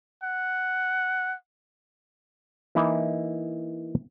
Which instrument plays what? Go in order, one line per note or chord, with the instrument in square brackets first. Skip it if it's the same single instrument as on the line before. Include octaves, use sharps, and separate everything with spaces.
[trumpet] F#5
[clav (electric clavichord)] E3 A#3 D#4 E4